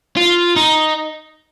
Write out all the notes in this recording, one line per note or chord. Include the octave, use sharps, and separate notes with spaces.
F4
D#4